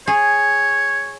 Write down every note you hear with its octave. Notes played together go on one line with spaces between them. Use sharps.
G#4 C#5